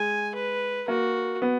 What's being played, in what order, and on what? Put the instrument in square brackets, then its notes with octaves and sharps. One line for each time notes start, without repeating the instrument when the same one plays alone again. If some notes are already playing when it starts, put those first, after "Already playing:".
Already playing: [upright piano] G#3 [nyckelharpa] G#5
[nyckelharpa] B4
[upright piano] A#3 [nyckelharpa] F#4
[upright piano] B3